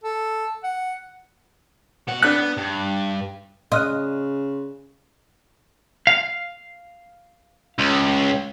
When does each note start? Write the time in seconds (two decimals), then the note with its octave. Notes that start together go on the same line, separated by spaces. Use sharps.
0.04 A4
0.64 F#5
2.08 B2 F#5
2.22 B3 D4 F#6
2.39 B3
2.57 G2
3.72 C#3 D#5 C6 F6 F#6
6.07 F5
7.79 C#2